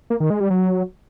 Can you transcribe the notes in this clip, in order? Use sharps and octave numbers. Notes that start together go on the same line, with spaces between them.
A#3
D#3
G#3
G3
F#3